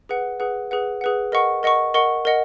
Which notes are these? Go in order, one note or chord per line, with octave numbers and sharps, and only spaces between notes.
G#4 B4 F#5
G#4 B4 F#5
G#4 B4 F#5
G#4 B4 F#5
A#4 D#5 F#5 C#6
A#4 D#5 F#5 C#6
A#4 D#5 F#5 C#6
A#4 D#5 F#5